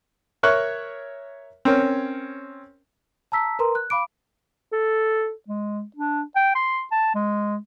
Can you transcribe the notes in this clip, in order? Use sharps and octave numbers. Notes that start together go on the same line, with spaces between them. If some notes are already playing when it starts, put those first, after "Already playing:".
A#4 C#5 E5 C#6 F#6
C4 C#4 A#4 C#5
A5 A#5 E6 B6
A#4 B4 A#5 C6
F#6
F5 B5 D6 D7
A4
G#3
D4
G5
C6
A5
G#3